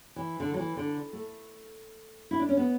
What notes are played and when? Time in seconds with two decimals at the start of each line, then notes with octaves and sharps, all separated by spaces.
0.16 E3
0.40 D3
0.54 F#3
0.58 E3
0.77 D3
1.13 A3
2.31 E4
2.39 D4
2.49 C#4
2.57 B3